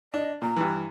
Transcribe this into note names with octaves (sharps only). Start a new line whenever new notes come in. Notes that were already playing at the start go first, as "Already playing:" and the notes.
D4 D#5
A#2 A#5
G2 E3